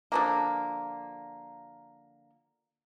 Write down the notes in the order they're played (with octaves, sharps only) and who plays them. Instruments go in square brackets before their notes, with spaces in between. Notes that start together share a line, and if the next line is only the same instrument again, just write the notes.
[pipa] D3 F3 A#3